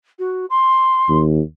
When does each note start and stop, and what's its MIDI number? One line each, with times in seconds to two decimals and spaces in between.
0.19 0.46 66
0.50 1.17 84
1.09 1.41 39